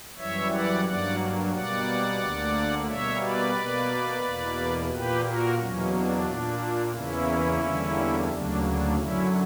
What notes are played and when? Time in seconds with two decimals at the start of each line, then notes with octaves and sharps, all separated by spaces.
0.17 F#2 E3 G3 C#5 E5
0.51 D5 F#5
0.85 G2 F#3 A#3 D5 F#5
1.52 B2 G3 A#3 D5 F#5
2.20 D2 D3 A#3
2.87 B2 G3 A#3 C#5 E5
3.21 B4 D5
3.56 B2 A#3
4.23 E2 B2 A#3
4.90 A#2 A#3 G4 B4
5.24 F#4 A#4
5.58 E2 B2 F#3 A#3 C#4
5.92 D4
6.26 A#2 A#3
6.93 E2 C#3 E3 A#3 C#4 E4
7.61 E2 D3 G3 A#3
8.29 D2 C#3 F#3 A#3 D4
8.62 D4
8.96 F#2 D3 F#3 C#4 E4